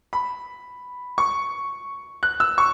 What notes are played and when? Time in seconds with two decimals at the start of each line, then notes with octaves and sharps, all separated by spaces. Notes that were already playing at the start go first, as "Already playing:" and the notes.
0.13 B5
1.18 C#6
2.23 F#6
2.40 E6
2.58 C#6